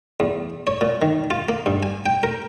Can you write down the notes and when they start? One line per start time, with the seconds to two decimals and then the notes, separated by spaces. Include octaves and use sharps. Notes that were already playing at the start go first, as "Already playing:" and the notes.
0.20 E2
0.67 C#5
0.81 A#2
1.02 D#3
1.30 F4
1.49 A#3
1.66 G2
1.83 G#5
2.06 G5
2.23 A#4